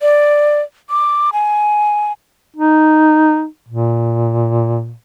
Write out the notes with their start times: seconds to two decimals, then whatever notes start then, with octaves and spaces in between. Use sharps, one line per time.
0.01 D5
0.90 D6
1.33 G#5
2.56 D#4
3.69 A#2